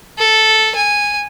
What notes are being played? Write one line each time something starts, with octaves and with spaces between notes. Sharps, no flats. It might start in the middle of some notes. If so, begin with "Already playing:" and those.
A4
G#5